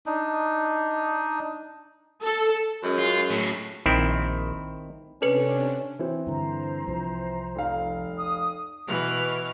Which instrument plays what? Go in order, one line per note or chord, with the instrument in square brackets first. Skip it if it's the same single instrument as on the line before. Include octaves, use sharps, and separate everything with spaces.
[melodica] D4 D#4
[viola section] A4
[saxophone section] F#2 G#3 C#4
[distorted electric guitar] F4
A2 F#3
[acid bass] A#1 [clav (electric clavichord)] D#3 C4 E4
[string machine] C3 D4 [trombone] C#4 [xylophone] A4 B4 C#7
[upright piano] E3 C4
[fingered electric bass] G2 D3 [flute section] C5 A#5
[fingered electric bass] C2 F3
[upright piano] F1 F5
[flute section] D#6
[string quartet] B2 E3 F6